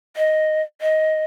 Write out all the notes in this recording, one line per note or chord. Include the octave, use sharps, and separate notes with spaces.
D#5
D#5